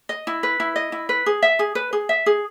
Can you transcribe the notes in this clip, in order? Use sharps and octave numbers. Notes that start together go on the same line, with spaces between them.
D#5
E4
B4
E4
D#5
E4
B4
G#4
E5
G#4
B4
G#4
E5
G#4